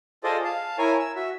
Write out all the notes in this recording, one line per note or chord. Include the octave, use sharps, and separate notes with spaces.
F4 G#4 A4 C5 D5 D#5
F5 A5
E4 A#4 C#5 G#5
E6
F#4 E5